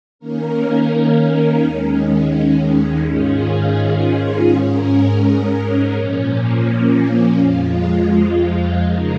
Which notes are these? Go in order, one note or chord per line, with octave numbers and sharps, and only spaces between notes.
D#3 A#3 C#4 A#4
D#2 D#3 G#3 C#4
G#2 D#3 C#4 F4 G#4
G#2 G#3 C#4 A#4
A#2 F3 A#3 C#4
F2 F3 G#3 F4
C#3 F3 G#3 D#4 A#4